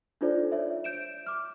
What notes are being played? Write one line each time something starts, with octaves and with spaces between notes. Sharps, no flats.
D4 D#4 F4 A4 C5 D5
C#5 E5
G6 D7 E7
D6 F6